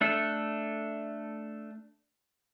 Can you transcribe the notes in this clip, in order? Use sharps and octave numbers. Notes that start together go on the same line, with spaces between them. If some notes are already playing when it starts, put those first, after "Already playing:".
A3 D4 A4